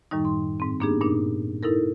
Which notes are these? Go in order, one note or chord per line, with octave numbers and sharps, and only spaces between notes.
F#2 A2 D#3 G3 D#4
C6
G#2 C4
A#3 B3 D4 D#4 G4 G#4
G2 A#2 D4 D#4
D#4 E4 A4 A#4